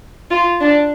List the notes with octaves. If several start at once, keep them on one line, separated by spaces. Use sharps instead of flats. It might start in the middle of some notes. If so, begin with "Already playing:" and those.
F4
D4